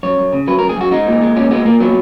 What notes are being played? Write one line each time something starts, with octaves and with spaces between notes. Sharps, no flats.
F#2 C#5
F#2
C#3
F#3 B4
A#4
F#2
G#4
F#2 F#4
G#3 D#4
A#2
G#3
A#2 C#4
G#3 B3
A#2 A#3
F#3 B3